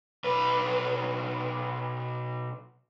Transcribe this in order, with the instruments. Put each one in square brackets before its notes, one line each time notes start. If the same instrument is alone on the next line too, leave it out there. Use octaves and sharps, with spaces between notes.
[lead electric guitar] B1 B4